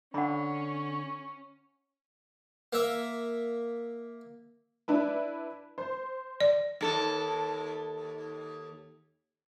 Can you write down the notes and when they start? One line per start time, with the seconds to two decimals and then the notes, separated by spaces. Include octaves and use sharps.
0.14 D3 C#4 F#5 B5
2.73 A#3 E5
4.88 D4 E4 B4
5.78 C5
6.41 D5
6.81 D#2 A4